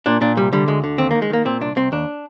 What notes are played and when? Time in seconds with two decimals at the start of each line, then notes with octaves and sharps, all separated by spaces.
0.06 A#2 D4
0.21 A#2 D4
0.37 C2 G3
0.53 D3 G3
0.68 D2 G#3
0.84 D3
0.98 D#2 C4
1.11 A#3
1.15 D#3
1.22 G#3
1.30 D#3 A#3
1.45 A#2 C4
1.61 C2 D4
1.76 C2 C4
1.92 D#2 D4